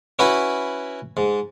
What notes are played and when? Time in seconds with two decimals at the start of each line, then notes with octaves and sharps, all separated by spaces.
0.19 C#4 E4 F#4 B4 F#5 B5
1.17 G#2